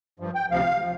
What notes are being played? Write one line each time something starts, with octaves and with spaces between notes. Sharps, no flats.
G2 F3
G5
D2 C3 F3 F5
F3